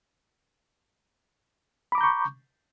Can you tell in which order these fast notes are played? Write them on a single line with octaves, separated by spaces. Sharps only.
B5 D6 A#5 G6 C#6